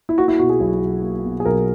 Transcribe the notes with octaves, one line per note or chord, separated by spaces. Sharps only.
E4
A#3 F#4
E4
B2 F#4
G#4
B1
B1
A#3
B2
G#4
B1 A#4